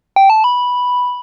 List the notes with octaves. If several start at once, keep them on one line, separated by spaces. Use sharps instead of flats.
G5
A5
B5